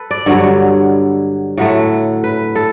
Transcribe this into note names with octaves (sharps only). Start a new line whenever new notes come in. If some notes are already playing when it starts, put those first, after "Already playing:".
Already playing: A4 B4
D5
G2 D3 F#3 C#5
A2 F#3 A3
B4
A4